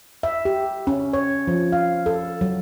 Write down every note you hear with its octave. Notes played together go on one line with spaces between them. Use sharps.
E5
G4
C#4
C#5
F3
F5
A4
F#3